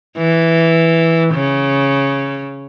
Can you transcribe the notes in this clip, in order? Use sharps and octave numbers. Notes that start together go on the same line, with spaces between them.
E3
C#3